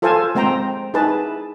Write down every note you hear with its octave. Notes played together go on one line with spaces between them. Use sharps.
F4 A4 C5 F5 G#5 A5
G#3 C4 C5 G5 A#5
D#4 E4 G#4 B4 A5